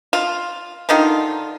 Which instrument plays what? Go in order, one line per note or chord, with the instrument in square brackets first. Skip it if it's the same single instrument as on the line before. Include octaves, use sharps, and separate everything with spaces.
[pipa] F4
D3 D#3 D#4 F4